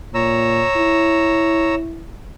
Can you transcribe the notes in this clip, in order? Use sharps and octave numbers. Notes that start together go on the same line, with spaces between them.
A#2 C#5 A#5 E6
E4